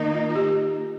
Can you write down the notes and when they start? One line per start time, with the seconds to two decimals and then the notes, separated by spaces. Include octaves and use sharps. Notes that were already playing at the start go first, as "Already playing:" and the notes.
Already playing: D#3 A#3 D#4
0.14 F4
0.29 F4
0.36 G4